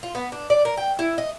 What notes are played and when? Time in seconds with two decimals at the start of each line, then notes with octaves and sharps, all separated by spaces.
0.03 F4
0.15 B3
0.32 D4
0.50 D5
0.65 A#4
0.77 G5
0.99 E4
1.18 D#5